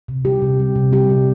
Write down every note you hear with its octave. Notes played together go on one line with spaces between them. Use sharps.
C3
G3 G4
C3
G3
C3
G3 G4
C3